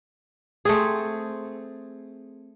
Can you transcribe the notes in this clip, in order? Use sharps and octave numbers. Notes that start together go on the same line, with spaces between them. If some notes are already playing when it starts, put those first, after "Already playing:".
A3 C4 G#4